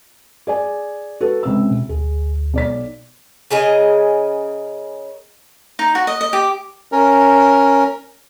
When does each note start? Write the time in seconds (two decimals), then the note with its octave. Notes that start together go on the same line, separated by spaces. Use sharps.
0.47 G#4 D5 G#5
1.21 F#4 A4 B4
1.43 C#2 C3 E6
1.71 B2
1.89 D2 G#4
2.54 B1 D5 B6
3.51 C#3 G#4 A#4 D#5
5.79 D#4
5.95 F#4
6.07 D#5
6.21 D#5
6.33 G4
6.92 C#4 A#4